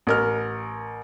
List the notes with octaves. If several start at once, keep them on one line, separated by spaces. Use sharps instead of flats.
A1 A#4 F6